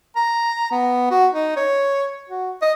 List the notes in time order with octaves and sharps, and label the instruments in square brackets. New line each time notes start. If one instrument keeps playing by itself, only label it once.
[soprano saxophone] A#5
B3
F#4
D#4
C#5
F#4
D#5